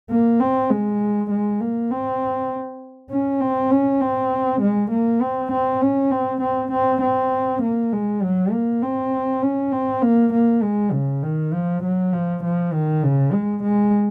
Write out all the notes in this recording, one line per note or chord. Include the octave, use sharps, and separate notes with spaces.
A#3
C4
G#3
G#3
A#3
C4
C#4
C4
C#4
C4
G#3
A#3
C4
C4
C#4
C4
C4
C4
C4
A#3
G#3
F#3
A#3
C4
C#4
C4
A#3
A#3
G#3
C#3
D#3
F3
F#3
F3
F3
D#3
C#3
G#3
G#3